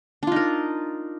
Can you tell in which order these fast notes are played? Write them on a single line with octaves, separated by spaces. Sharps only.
D4 F4 D#4 A#4